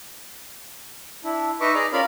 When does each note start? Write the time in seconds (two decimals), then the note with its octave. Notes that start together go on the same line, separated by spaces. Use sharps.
1.24 D4 E4
1.61 D#4 B4 D#5 E5 C#6 D6
1.74 G#4 D5 D#5 A#5 D6
1.93 C#4 F4 A#4 D5 F5 B5